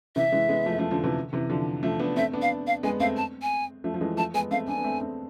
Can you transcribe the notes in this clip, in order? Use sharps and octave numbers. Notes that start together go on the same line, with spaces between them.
C3 E3 E5
E3 G#3
G#3 B3
F3 A3
F3 A3
D3 F3
C3 E3
C3 E3
D3 F3
F3 A3
B3 D4
A3 C4 E5
B3 D4
F5
F5
G#3 B3 G#5
A3 C4 F5
A5
G#5
F3 A3
F3
E3 G#3
F3 A3 A5
G#3 B3 G#5
A3 C4 F5
B3 D4 G#5
B3
A3 C4
A3 C4